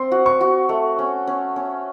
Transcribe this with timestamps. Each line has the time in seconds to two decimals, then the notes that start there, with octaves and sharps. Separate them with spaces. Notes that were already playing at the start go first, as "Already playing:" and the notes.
Already playing: C4 C6
0.12 F#4
0.26 C#6
0.41 F#4
0.69 A3
0.99 C#4
1.27 C#4
1.56 C#4